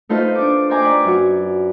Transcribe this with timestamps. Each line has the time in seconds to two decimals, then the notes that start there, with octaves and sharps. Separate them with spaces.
0.09 A3 D#4 F4 B4 C5 D#5
0.35 D4 D6
0.70 C5 D#5 G5 G#5 A#5 D6
0.82 B4 D5
1.04 F#2 F#4